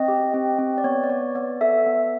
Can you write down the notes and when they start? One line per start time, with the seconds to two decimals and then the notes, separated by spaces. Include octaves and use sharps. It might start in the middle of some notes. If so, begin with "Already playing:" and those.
Already playing: C4 D#5
0.08 G4
0.34 C4
0.59 C4
0.78 D5
0.84 B3 C#5
1.04 D5
1.10 B3 C#5
1.35 B3 D5
1.61 A4 E5
1.86 B3